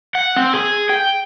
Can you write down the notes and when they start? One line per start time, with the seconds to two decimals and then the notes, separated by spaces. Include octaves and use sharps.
0.15 F#5
0.36 C4
0.53 G#4
0.90 G5